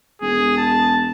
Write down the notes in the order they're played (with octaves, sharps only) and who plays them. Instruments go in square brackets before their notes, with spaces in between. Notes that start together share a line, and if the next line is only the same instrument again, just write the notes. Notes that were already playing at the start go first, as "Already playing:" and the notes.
[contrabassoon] E1 [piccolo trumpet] G#4
[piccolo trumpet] A5